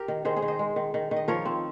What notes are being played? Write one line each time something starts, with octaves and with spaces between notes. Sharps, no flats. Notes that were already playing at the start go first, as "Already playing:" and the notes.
Already playing: G4 A#4
D#3
D#3 G#4 C5
G#4 C5
D#3
C5 D#5
G#3
D#3
D#3
D#3
D#5
F3 A#4 C#5
C4